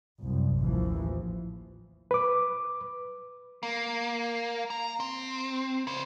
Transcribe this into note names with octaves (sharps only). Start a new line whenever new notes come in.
C2 F#2
A1 D#2 E3 F3
B4 D6
A#3
A#5
C4
C#3 C5